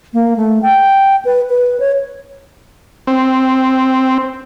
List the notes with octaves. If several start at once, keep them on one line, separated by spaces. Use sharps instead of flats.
A#3
A3
G5
B4
B4
C#5
C4